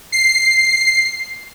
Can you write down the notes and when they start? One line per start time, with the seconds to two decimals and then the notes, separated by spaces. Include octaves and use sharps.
0.12 C7